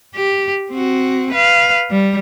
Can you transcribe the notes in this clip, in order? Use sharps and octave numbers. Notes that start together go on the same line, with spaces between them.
G4
C4 F#4
B4 F5
G3